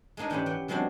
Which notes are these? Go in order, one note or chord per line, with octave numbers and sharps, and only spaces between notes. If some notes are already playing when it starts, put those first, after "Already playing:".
G#3 A#3 D4 D#4 A#4
G#2 E3 C#4 E4 G4 B5
E3 F#5 G5
F#3 G#3 B3 C4 D4 F#4